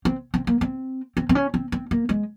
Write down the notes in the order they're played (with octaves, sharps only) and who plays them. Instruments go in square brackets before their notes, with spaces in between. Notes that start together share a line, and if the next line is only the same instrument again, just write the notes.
[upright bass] C4
C4
A#3
C4
C4
C4
C#4
C4
C4
A#3
G#3